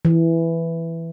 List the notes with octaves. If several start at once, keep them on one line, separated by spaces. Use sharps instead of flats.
E3